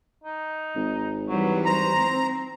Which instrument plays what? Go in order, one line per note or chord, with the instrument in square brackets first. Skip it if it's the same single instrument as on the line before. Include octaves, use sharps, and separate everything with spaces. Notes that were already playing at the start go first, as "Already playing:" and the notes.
[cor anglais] D#4
[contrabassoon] G#1
[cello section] E3 G3 B4 [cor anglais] F#3
[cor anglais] C5 [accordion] A#5
[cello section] C4